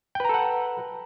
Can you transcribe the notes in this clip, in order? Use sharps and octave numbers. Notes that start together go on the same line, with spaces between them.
A4 B4 F#5 G5 A#5